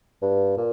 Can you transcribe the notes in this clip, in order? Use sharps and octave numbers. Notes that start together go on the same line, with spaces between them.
G2
A#2